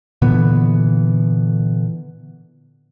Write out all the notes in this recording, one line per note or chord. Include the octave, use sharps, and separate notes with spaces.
A#2 D3 E3 B3